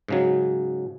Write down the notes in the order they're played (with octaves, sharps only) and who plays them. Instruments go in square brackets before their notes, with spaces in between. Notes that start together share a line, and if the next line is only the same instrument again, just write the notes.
[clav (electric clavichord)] G#2 C#3 F#3